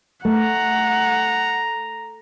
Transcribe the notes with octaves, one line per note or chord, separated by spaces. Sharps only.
A3 F#5 A#5